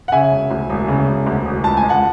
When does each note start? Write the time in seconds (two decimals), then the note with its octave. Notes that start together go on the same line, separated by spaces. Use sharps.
0.08 F#5
0.12 C#3 E5 G#5
0.32 E1
0.51 D2
0.70 E1
0.88 C#3
1.08 E1
1.27 D2
1.45 E1
1.64 C#2 A5
1.77 G#5
1.83 C#2
1.89 F#5 A5